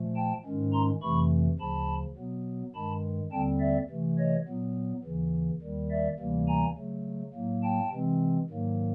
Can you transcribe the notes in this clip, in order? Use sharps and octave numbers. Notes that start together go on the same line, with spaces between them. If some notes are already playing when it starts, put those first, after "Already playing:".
Already playing: A#2 F3 A3
G5 A5
G#2 D#3 G#3 C#4
A#5 C6
F2 C3 E3 A3 B5 C#6
D2 C#3 F3 A5 B5
B2 F#3 B3
G2 D#3 G#3 A5 B5
D#2 D3 G3 C4 G5 A5
D5 E5
C3 E3 A3
C#5 D#5
A#2 F#3 B3
D#2 C#3 E3
D#2 D#3 G3
D5 E5
D2 C3 E3 G3 A#3
G#5 A#5
C#3 F#3 A3
A2 F#3 A#3
G5 A5
C3 E3 G#3 C4
G#2 D#3 F#3 A#3